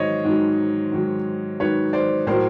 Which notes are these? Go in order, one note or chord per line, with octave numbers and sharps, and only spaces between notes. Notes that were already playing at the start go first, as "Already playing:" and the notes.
Already playing: G#2 D#3 F#3 C5 C#5 D#5
G#2 D#3 F#3
G#2 D#3 F#3
G#2 D#3 F#3 B4 C#5
C5 D5
A2 F#3 A#4 C5